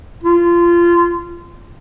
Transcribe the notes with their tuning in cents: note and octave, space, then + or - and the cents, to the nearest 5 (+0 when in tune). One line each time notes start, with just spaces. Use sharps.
F4 -20